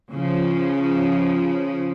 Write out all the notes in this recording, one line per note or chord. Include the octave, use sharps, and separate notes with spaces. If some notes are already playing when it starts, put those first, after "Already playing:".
C#3 F3